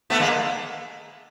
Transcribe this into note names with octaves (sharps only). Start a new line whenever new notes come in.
A3 B3
G#3 A#3